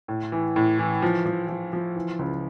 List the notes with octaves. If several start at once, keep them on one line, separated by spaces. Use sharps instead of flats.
A2
E3
A2
E3
F3
F3
F3
F3
E3
C#2